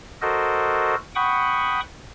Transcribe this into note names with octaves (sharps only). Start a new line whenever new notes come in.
F#4 A4 A#4 C5 D#5
F#5 G5 B5 C#6 D#6